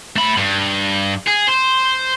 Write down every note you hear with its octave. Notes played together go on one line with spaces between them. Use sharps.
A3 B5
G2
G#4
C5